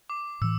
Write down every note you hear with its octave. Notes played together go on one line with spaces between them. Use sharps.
D6
A2 E3 E6